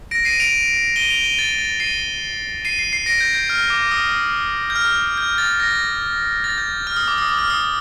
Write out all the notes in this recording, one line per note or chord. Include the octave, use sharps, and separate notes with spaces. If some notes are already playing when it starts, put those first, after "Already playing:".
A#6 D7
C7 D#7
D7 F7
D#7 G7
D7 F7
D#7 G7
A6
A6
C7 D#7
C7 D#7
C7
C7
A#6 D7
G6
G6
F6
D6
D#6
G6
F6
G6
A6
A#6
A6
G6
F6
D#6
D6
D#6
D6
F6
D#6